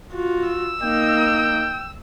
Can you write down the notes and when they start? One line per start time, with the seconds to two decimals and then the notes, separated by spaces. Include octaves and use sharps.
0.12 F4 F#4
0.48 E6
0.83 A#3 D#4 G5